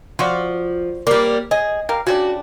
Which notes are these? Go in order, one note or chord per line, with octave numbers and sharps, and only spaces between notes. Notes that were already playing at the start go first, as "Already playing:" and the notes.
F3 F4 F#4 D5
G3 A#3 D5
G#4 D#5
G3 A#4 F5
C#3 G3 D4 F#4